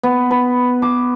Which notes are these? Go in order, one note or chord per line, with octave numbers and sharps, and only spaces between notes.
B3
B4
D6